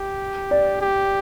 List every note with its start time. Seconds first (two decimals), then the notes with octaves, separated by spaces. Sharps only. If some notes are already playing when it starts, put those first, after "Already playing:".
Already playing: G4
0.51 D5
0.81 G4